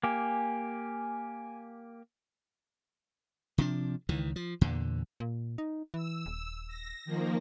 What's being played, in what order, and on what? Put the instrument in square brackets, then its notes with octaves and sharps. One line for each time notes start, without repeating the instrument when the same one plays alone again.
[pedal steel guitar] A#3 G4 [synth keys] G#5
[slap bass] C3 F3 D4
C#2 D#3 E3
F3
E2 A#2 D3
[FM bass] A#2
D#4
[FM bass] E3 [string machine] E6
[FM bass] D#1
[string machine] A#6
D#3 F3 A#3